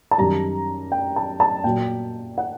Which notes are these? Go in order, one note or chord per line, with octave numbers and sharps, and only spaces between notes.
A5
F#2 D#3 G3 A#5
G5
A5
A5
A#2 F#3 G5
F#5